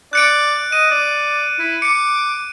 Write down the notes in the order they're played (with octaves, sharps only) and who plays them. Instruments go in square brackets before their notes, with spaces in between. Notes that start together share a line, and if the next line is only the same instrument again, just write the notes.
[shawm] D5 [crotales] F#6 C#7 D7
[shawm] D#5 [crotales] D#7
[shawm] D5
E4
[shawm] D6 [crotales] C#7